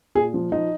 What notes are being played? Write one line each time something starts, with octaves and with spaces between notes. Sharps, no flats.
A#2 G#4
F3
F3 D#4